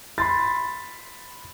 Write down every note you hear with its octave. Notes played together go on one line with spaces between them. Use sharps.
B5 C6 A6